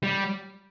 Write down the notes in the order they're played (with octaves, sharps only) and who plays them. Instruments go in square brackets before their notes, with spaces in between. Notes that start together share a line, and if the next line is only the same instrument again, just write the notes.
[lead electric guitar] G3